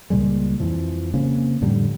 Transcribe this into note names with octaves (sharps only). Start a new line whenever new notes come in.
C#2 A#2 G3 G#3
F2 E3 F3
C#3 A#3 C4 C#4
F2 A2 D3 G3